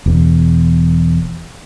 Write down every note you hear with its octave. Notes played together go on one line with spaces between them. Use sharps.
E1 E2